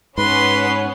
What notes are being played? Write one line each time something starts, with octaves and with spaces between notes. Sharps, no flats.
G#2 B3 C#4 B4 C6